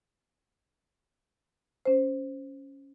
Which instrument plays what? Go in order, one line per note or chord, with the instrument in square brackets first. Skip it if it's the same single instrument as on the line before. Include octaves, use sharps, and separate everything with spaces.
[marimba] C#4 C5